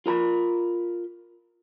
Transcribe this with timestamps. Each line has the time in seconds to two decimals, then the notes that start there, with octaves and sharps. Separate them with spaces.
0.06 F4 A#4 A#5 B5